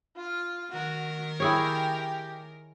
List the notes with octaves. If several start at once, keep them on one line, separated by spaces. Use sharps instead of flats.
F4 F6
D#3 F#4 A#4
E4 G4 G#4 C#5 G5